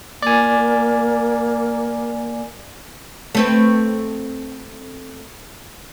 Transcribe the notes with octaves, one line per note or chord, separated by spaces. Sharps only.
A#3 D5 G#5
A3 C4 B4